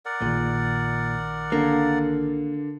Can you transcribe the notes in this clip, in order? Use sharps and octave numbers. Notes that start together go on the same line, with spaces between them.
A#4 D5 F#5
A#1 A#2 D#3
D3 A#3